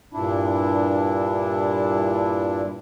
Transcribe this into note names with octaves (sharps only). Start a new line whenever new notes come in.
G2 A#2 D4 E4